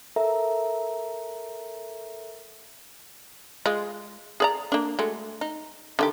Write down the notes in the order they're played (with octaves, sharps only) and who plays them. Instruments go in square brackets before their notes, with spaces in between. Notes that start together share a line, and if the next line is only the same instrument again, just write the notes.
[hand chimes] A4 A#4 E5 A#5
[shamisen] G#3 F4
G#4 D5 A#5
A#3 D4
G#3 A3 F#4
D#4
D3 D#3 G4